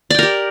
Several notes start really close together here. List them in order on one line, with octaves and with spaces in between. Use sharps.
D5 G5 A#4 G4